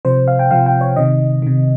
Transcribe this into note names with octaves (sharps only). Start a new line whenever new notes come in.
C3 F3 C5
F5
G5
C3 F3 F5
G5
C#5
C3 D#3 D#5
C3 D#3